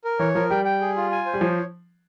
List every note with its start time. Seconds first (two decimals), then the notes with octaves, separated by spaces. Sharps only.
0.05 A#4
0.19 E3 C#5
0.35 F3 A#4
0.50 G3 G5
0.65 G5
0.81 G#4
0.96 F4
1.11 G#5
1.26 C5
1.34 G3
1.41 F3 C#5